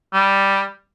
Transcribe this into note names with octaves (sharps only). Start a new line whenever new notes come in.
G3